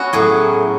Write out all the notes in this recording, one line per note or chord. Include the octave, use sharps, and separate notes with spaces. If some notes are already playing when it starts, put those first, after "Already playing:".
Already playing: B3 C#4 F#4
A2 F#3 G#4